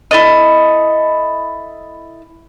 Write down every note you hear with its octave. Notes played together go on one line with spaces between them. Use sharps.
E4 F4 A4 D#5